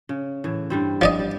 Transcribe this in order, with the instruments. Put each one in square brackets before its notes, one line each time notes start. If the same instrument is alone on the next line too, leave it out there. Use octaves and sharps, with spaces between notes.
[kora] C#3
A2 E3
G2 G3 C4
[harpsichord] F3 D5 D#5
[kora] G3